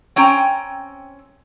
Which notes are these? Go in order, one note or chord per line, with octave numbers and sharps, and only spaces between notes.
C4 C#4 G5 A#5